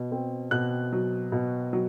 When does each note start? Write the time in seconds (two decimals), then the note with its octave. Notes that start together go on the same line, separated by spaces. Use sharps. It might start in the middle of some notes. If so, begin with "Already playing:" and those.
Already playing: B2
0.12 C4
0.51 B2 F#6
0.92 F#3
1.32 B2
1.73 F#3